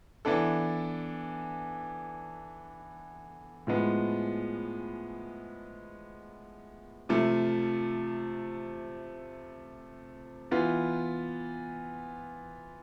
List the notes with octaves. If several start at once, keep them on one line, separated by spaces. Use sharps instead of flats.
E3 B3 D4 A4
A2 F3 G#3 B3
C3 F3 A3
E3 B3 F4